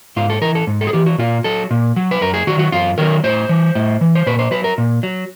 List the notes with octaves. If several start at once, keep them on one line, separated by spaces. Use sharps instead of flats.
G#2 F4
A4
E3 A#4
A4
G#2
A4
G#4
E3 G4
F#4
A#2 F4
F#3 A4
A#2
F#3
B4
F#2 A#4
G#4
D#3 F#3 F#4
F#4
F#2 F4
D#3 F#3 A#4
A2 C5
E3
A2
E3
C5
A#2 B4
C5
F#3 B4
A#4
A#2
F#3